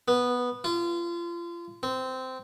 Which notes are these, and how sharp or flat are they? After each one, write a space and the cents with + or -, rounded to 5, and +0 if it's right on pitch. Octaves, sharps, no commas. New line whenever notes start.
B3 -5
F4 -30
C4 -15